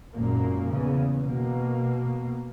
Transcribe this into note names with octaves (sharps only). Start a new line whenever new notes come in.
G#1 F#2 A#2 A#3
E2 C#3
B2 A#3